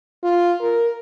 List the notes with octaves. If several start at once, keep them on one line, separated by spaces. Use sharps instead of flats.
F4
A#4